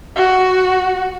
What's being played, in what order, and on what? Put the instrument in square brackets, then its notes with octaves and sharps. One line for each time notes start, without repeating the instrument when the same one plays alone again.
[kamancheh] F#4